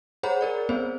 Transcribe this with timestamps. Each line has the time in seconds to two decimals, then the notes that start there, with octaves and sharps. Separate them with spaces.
0.23 G#4 C5 C#5 F#5 A#5 B5
0.41 G#4 A#4 D5
0.69 B3 C4 G#4 C5